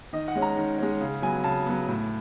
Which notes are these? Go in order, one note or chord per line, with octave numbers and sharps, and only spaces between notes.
D#3 D#5
F#5
G#3 C#4
A#5
D#3
G#3 C#4
C#3
F#3 B3 G#5
C#3 A5
F#3 B3
A2